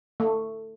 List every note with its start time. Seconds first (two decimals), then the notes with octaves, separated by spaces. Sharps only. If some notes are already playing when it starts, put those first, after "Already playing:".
0.20 A3